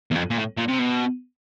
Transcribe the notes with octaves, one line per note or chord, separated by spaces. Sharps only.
E2
F2
A#2
A2
A#2
C3
B2